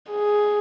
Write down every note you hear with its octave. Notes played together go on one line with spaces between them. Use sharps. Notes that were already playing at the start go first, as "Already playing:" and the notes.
G#4